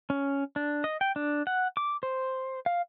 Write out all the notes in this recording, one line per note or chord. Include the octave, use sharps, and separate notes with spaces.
C#4
D4
D#5
G5
D4
F#5
D6
C5
F5